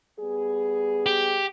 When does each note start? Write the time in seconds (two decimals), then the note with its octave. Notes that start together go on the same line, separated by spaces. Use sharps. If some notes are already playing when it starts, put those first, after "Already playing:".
0.19 G3 B3 G#4
1.06 G4